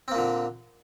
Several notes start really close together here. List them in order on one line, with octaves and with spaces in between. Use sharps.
C4 A#3 A#2 D3